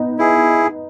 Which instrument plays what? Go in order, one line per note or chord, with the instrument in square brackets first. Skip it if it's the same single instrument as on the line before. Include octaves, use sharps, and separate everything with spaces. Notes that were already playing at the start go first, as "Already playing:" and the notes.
Already playing: [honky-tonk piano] B3 D#4
[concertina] E4 G#4